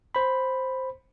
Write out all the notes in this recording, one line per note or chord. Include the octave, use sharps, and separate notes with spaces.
C5 B5